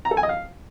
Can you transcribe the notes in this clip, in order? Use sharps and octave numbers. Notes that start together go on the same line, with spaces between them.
A#5
A4
G#5
D#5
F5